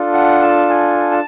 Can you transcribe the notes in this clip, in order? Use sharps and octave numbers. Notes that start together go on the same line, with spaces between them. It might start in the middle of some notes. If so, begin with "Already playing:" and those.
Already playing: D4 F4 A4
F#5
A5
G#5
A5